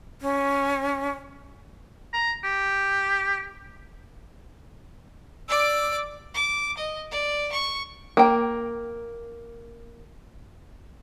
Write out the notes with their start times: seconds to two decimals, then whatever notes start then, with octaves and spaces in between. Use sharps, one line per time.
0.21 C#4
2.14 A#5
2.44 G4
5.49 D5 D6 E6
6.34 D6
6.77 D#5
7.11 D5
7.52 C#6
8.17 A#3 G5